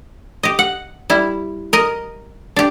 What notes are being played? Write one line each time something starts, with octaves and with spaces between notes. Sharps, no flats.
G4 D#5
F#5
G3 E4
A#4 D#5
D4 G4